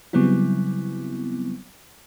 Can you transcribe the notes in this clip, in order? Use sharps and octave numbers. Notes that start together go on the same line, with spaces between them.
C#3 F#3 G3 B3 C4 E4